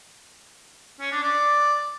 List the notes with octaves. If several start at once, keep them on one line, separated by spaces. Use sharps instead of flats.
C#4
D4
D5